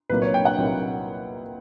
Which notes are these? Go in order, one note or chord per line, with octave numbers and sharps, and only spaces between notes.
C2 A#2 F#3 A#3 D#4 B4
C#5
G5
F#5
C2 A#2 F#3 A#3 D#4